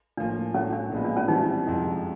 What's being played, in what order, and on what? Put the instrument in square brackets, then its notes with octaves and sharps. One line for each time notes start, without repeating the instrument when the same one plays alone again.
[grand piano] A2 F3 A#3 [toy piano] D4
[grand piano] A2 F#3 A3 [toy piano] C#4
[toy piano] D4
[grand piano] A#2 F3 G#3 B3
[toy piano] D4
C#4
[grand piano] E3 G3 C4 E4 [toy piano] D#4
[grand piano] F2 C3 F3 G#3